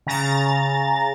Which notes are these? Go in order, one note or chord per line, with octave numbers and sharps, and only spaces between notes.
C#3 A#5 A6